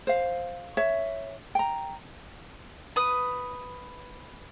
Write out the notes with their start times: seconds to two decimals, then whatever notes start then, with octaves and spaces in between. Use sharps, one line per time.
0.07 C5 F5
0.77 C#5 E5
1.55 G5 A#5
2.96 B4 D#6